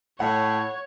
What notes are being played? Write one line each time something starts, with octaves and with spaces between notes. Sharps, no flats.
A2 C#5 F#5